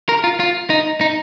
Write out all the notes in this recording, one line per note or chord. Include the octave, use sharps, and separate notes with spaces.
A#4
F4
F4
D#4
D#4